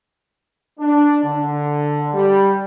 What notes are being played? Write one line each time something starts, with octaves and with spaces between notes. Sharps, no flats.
D4
D3
G3